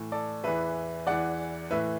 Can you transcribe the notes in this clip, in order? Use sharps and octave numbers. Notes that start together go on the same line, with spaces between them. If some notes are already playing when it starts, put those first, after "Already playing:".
Already playing: A2 E3
A4 D5
E2 E3 B4 E5
E2 E3 D5 F#5
A2 E3 B4 E5